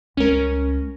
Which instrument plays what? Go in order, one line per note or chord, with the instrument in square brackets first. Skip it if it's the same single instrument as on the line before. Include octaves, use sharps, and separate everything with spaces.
[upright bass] C#2 G3 [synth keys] C#4 A#4